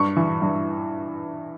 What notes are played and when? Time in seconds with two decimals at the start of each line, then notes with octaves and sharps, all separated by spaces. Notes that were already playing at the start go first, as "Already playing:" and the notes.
Already playing: G2 C#6
0.17 E3
0.42 G2